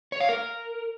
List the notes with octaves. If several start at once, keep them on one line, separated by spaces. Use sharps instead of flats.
C#5
F5
A#4